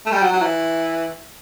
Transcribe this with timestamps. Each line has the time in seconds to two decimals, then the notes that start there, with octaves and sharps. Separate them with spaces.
0.06 A3
0.12 G3
0.22 F#3
0.32 F#3
0.42 E3